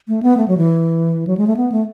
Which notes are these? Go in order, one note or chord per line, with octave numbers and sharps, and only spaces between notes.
A3
B3
A3
F#3
E3
F#3
G#3
A3
B3
A3